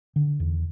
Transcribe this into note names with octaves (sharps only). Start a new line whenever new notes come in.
D3
E2